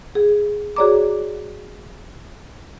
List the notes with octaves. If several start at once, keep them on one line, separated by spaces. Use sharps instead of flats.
G#4
F#4 G#4 C#5 D5 A#5 D6